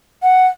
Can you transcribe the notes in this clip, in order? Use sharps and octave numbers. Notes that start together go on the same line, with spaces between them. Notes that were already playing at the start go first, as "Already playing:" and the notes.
F#5